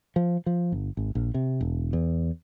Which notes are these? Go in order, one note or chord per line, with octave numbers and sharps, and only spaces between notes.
F3
F3
G1
G#1
A#1
C3
E1
E2